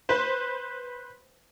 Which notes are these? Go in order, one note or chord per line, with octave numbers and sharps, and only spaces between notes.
B4 C5